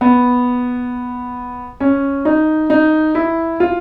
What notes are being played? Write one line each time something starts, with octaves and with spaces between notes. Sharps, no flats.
B3
C#4
D#4
D#4
E4
F4